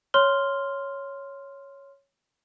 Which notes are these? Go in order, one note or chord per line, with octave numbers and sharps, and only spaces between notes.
C#5 C6 F6 G7